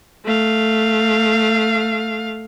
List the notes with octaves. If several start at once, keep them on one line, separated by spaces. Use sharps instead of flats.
A3 F5